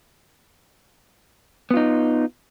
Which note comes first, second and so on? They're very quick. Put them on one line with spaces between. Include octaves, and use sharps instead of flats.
B3 F4 D#4